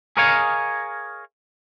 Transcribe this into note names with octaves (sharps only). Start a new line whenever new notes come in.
G#4 A#4 C#5 D#5 F5 G#5